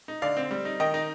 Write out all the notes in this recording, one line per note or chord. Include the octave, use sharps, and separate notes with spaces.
D#4
D3 D5 F5
C4
G3
D#4
D#3 D#5 G5
D#4